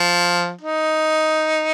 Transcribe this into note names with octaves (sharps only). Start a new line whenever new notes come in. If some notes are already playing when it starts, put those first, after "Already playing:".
Already playing: F3
D#4